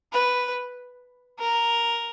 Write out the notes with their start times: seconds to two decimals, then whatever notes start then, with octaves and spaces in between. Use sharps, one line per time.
0.13 B4
1.39 A#4